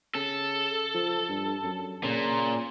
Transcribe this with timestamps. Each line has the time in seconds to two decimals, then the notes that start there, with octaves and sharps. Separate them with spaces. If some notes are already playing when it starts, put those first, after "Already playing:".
0.15 C#3 A4
0.95 F3
1.29 G2
1.63 F#2
2.03 A#2 C#3